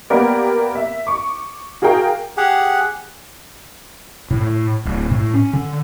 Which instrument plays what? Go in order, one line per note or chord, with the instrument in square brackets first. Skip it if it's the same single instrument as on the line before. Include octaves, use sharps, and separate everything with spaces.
[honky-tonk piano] A#3 B3 G4 A#4 D5
E5
C#6 D6
F#4 G#4 A#4 F5 G5 A#5
[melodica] G4 G#4 F#5
[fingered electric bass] A2
D1
A2
C#4
D3